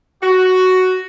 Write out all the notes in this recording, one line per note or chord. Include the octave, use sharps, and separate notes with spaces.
F#4